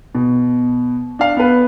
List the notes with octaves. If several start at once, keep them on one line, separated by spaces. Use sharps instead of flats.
B2
D4 F5
B3 B4